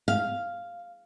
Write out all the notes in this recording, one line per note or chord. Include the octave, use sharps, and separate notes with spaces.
F5